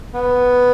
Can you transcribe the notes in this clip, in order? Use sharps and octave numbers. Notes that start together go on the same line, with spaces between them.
B3